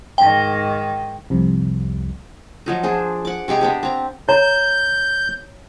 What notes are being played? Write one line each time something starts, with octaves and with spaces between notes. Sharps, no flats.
G#2 D#3 G5
C2 F2 C3
F3 F#3 D#4
D4 G#4 C5
F#5 D6
C3 G#3 G4 A#5
B3 D4 G4
C4 A#5
C#5 A#5 G6